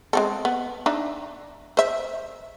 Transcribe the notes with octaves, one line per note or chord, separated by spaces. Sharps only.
G#3 C4 A4
B3
D4 D#4 E5
C5 E5